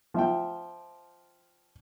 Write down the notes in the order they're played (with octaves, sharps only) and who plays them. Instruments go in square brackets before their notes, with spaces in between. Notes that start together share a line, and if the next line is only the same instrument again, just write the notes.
[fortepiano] F3 E5 G5